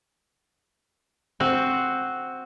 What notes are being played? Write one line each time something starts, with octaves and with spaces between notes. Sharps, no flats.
C4 F#4 C5